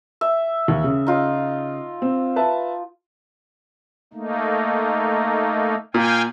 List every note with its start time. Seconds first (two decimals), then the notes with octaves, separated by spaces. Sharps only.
0.21 E5
0.68 D#2
0.84 C#3
1.07 D#4 F4
2.02 C4
2.36 B4 E5 A5
4.13 A3 A#3 D#4
5.94 A#2 F5 G5 G#5